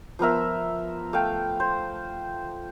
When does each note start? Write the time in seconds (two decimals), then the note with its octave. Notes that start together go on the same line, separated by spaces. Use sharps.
0.19 F3 B3 A#4 E5
1.13 A3 F5 G5
1.60 C5